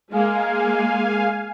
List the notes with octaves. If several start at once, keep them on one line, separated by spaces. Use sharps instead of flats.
G#3 A#3 F5 G#5